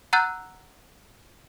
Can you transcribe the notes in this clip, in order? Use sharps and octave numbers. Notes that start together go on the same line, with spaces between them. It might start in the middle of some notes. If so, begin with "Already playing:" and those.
F#5 A#5 E6 F#6 G6 A6